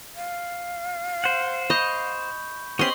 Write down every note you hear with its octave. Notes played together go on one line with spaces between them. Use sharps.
F5
C5 F#5
D#5 B5 C#6 G6
B3 C#4 G4 C5 D#5 C6 C#6 F#7